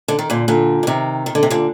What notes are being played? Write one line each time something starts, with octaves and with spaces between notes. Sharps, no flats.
D3
D#3
A#2 D3
A#2 D3
D3
C3 D#3
D#3
D3
C3
A#2 D3